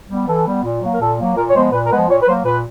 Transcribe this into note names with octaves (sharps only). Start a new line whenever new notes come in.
G3 B3
E3 A4
G3 B3
A#2
F#3 A#3
A#4
A#2 A4
F#3 A#3
A#2 A#4
C#5
F3 G#3 B3 C5
A#2 B4
A#4
F3 G#3 B3 B4
A#2 C#5
B4
F#3 A#3 C5
A#2 B4